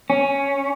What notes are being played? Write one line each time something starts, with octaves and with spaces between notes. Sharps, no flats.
C#4